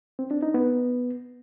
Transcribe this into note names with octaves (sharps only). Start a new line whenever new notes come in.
C4
D4
D#4
B3